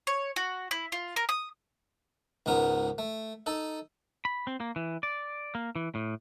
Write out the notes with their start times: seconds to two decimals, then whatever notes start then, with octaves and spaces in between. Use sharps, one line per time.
0.07 C#5
0.36 F#4
0.71 E4
0.92 F4
1.16 A#4
1.29 D#6
2.46 C#2 G#2 B3 A#4
2.98 A3
3.46 D#4 A4
4.25 B5
4.47 C4
4.60 A#3
4.76 E3
5.03 D5
5.55 A#3
5.76 E3
5.95 A2